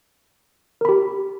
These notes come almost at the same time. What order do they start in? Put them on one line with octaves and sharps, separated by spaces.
A#4 B5 G4